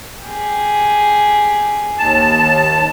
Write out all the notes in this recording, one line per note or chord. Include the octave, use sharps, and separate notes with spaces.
G4 G#4
D#2 A5